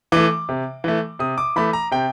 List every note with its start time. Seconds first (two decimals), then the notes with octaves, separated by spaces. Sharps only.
0.12 E3 A3 D6
0.49 C3
0.84 E3 A3
1.19 C3 D#6
1.38 D6
1.56 E3 A3 B5
1.73 A#5
1.91 C3 G5